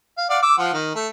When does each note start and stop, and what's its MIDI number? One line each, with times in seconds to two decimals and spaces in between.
0.17 0.28 77
0.30 0.38 74
0.30 0.38 77
0.30 0.38 78
0.43 0.56 86
0.43 0.56 88
0.58 0.73 53
0.58 0.73 65
0.58 0.73 78
0.73 0.93 51
0.95 1.08 57